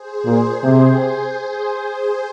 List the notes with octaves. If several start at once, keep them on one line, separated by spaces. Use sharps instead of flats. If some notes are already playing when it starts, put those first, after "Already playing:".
Already playing: G#4 C5
A#2
C3